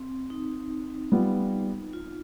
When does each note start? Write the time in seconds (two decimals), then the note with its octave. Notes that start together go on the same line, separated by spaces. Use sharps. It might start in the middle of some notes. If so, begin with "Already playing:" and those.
Already playing: C4
0.30 D#4
1.12 G3 B3 F4
1.93 F4